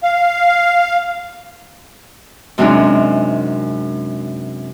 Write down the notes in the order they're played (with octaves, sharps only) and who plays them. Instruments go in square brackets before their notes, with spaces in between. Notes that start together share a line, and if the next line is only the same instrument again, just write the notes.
[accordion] F5
[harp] F#2 C3 D#3 G#3 C#4 D4